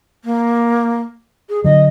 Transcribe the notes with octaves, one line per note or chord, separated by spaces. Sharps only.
A#3
G#4
D3 F#3 D#5